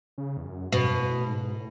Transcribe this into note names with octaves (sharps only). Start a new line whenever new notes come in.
C#3
E2
F#2
F#2 B2
A2
G#2
A2